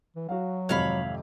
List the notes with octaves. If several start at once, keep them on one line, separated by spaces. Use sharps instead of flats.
E3
F#3 F#4 F5
G#1 F2 C3 C#5 F5 B5